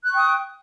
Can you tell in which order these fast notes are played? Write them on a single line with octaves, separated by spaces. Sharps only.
F#6 C#6 G5 D#6